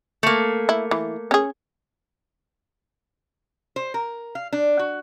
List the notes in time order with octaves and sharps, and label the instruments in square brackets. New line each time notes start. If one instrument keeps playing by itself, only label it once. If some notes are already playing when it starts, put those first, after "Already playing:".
[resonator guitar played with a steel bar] A3 A#3
[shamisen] E4
E3
C#4 G#4
[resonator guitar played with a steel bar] C5
A#4
F5
D4
F#4